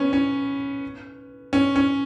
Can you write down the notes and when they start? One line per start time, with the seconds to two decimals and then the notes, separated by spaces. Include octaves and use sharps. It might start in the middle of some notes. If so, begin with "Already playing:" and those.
Already playing: B3 C#4
0.13 C#4
1.53 C#4
1.76 C#4